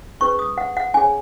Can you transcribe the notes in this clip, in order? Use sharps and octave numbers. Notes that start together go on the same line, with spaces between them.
C#4 G#4 B4 C#6
D#6
F#5
F#5
C#4 G#4 C#5 G#5